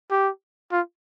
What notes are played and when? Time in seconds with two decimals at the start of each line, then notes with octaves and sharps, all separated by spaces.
0.11 G4
0.72 F4